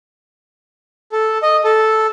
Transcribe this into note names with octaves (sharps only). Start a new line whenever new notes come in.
A4
D#5
A4